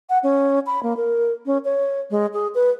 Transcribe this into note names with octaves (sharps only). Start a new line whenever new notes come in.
F#5
C#4
B5
A#3
A#4
C#4
C#5
G#3
G#4
B4